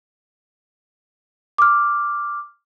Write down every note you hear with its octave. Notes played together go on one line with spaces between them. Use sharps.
D6 F6